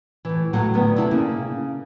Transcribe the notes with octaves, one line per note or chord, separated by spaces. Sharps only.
A2 E3
A2 C#3 F#3 A3 F#5
D2 D#3 B3
C3 E4 A4
C#3 A#3